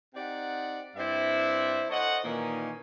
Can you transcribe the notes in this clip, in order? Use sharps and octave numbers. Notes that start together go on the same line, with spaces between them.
C4 D#4 G4 D5 F#5
G2 C4 E4 C5 D5 E5
A4 C5 C#5 D#5 F#5
A#2 D#3 E3 A#3 C#4 D#4